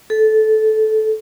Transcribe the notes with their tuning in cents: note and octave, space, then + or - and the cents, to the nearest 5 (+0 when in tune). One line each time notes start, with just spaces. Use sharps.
A4 -15